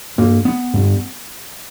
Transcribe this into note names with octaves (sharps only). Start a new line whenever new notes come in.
G2 A#3
B3
G2